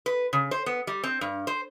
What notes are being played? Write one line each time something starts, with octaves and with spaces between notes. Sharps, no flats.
B4
C#3
C5
B3
G3
C4
G2
C5